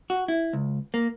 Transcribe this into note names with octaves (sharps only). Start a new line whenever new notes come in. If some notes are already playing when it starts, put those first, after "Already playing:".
F#4
E4
C#2
A#3